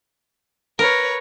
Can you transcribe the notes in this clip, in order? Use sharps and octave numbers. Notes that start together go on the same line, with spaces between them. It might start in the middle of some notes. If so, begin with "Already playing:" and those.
A#4 B4 C#5